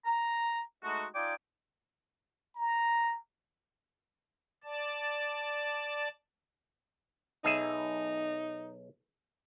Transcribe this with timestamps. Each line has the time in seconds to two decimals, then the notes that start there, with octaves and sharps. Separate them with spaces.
0.04 A#5
0.83 G#3 A3 D#4 F#4
1.15 D#4 F4 D5 G5 G#5 D6
2.56 A#5
4.64 D5 A5
7.44 B1 D#4 G#4 E5